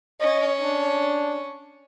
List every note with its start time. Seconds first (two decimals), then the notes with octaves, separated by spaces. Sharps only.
0.21 C#4 D#5
0.61 D4